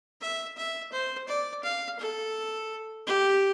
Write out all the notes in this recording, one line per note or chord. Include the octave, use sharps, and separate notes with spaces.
E5
E5
C5
D5
F5
A4
G4